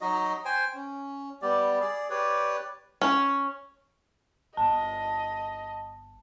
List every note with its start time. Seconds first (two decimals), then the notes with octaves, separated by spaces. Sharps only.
0.01 F#3 D#4 F#4 D#5
0.45 C5 G5 G#5
0.74 C#4
1.42 G3 B3 G4 D5
1.80 G#4 D5
2.10 G4 B4 C#5 D5
3.02 C#4
4.57 G1 D#5 A5